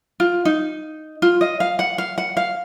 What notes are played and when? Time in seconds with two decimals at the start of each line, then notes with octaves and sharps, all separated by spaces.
0.20 F4
0.45 D#4
1.22 F4
1.41 D#5
1.60 F5
1.79 F#5
1.98 F5
2.18 F#5
2.37 F5